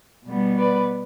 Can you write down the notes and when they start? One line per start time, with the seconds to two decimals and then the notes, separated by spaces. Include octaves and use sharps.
0.25 B2 G3 B3
0.58 B4 D5